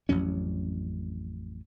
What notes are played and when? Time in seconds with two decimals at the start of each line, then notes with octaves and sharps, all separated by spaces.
0.09 A1 F2 F#3 C#4